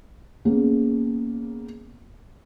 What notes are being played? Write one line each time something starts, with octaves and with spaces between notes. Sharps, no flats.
A#3 B3 C#4 G#4